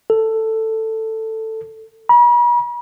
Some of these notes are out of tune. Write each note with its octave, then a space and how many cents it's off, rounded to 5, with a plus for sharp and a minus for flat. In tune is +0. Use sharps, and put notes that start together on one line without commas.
A4 +10
B5 -45